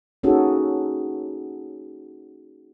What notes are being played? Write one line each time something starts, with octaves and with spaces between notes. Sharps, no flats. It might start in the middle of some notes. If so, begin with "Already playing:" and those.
A#3 C#4 D#4 F#4 G#4 A4